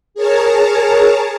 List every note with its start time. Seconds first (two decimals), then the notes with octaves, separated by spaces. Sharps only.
0.14 G#4 A#4 C#5 A5 A#5